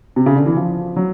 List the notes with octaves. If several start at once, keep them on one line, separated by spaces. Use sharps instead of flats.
C3
C#3
D3
E3
F3
F#3